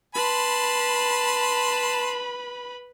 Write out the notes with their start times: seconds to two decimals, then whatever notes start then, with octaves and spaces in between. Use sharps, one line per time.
0.15 B4 A5 B5 C6